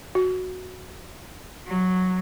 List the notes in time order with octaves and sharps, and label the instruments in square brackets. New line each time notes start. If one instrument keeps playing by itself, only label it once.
[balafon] F#4
[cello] F#3